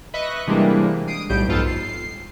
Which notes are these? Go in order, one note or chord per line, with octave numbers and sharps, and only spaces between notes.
B4 D#5 E5 C#6 F#6
C3 E3 G3 G#3 A#3 D4
D#6 C7 D7 D#7
B1 A2 G3 G6 D7
F2 G#2 B3 F4 A4 A5
C7